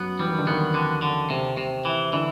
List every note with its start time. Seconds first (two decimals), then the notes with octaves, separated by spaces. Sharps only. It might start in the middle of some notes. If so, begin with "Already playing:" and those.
Already playing: F#2 F#3 B3
0.19 E3 G3
0.29 D#3
0.38 D3
0.47 D#2 D#3 B3
0.74 D3
1.02 D3
1.30 C3
1.57 C3
1.85 E3
2.13 D3 E3